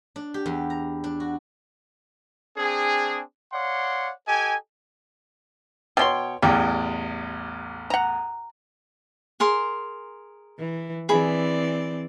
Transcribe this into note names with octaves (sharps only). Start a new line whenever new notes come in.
D4
G4
E2
A#5
D4
F#4
C4 D4 G#4
C#5 D5 F5 F#5 C6
G4 A4 D#5 G#5
B2 C#4 C#5 G5 C6
A1 E2 G3 G5
F#5 A#5
G#4 A#4 C6
E3
E3 C4 G#4 D5 B5